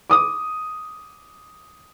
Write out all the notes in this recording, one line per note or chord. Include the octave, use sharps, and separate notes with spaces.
D6 D#6